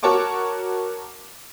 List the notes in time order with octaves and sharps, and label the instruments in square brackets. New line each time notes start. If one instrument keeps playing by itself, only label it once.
[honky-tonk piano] F#4 A#4 C#5 A5 C#6 D6